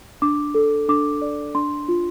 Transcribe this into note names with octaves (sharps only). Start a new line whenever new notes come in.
D4 D6
A4
D4 D6
D5
D4 C6
F4